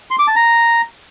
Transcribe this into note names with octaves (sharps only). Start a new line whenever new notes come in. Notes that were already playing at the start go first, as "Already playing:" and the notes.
C6
D6
A5
A#5